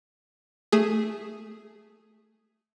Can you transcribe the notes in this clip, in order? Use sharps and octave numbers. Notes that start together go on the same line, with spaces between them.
A3 G#4